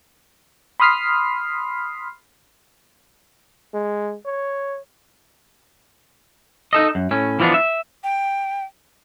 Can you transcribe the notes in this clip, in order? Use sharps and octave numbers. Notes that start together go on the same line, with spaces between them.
B5 C6 D#6 F6 B6 C7
G#3
C#5
D#4 A4 D#5
F#2
A2 C#4
E3 F3 G3 B3 D4
E5
G5